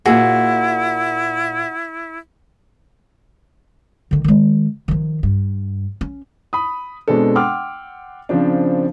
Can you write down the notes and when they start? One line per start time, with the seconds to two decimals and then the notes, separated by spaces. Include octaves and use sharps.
0.06 A#2 A#3 E4 F#4 G#4
4.11 D3 D#3
4.24 D#3 G#3
4.88 D#3 F3
5.23 G2
6.01 C#4
6.53 B5 D#6
7.08 B2 G#3 C4 D4 A4
7.35 F#5 G5 C6 D6 E6 F6
8.29 C#3 F3 C4 D4